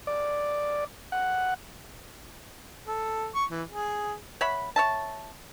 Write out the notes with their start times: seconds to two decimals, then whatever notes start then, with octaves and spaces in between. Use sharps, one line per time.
0.07 D5
1.12 F#5
2.87 A4
3.35 C#6
3.50 E3
3.70 G#4
4.41 C#5 E5 F#5 B5
4.76 C#5 E5 A5